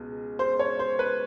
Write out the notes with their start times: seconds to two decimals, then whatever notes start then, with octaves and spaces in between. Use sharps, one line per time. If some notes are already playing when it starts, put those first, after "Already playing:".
Already playing: C#2 B2
0.39 C5
0.59 C#5
0.79 C5
0.99 B4